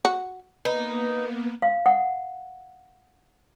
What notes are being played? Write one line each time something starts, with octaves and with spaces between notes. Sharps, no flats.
F#4
A#3 B3 D#4 B4
F5
F#5